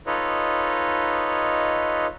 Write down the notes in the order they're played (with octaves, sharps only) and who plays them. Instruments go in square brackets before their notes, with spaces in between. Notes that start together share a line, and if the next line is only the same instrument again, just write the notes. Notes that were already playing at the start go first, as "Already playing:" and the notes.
[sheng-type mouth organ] D#4 F4 A4 B4 C#5 D#5